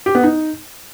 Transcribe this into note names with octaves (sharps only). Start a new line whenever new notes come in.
G4
B3
D#4